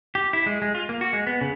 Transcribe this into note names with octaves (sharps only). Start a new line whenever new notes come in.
G4
E4
G#3
G#3
F4
A#3
F#4
G#3
B3
C#3